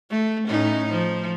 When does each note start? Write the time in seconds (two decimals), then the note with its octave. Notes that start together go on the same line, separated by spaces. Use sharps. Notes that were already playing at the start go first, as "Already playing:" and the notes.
0.10 A3
0.47 A2 C#4 D#4
0.91 F3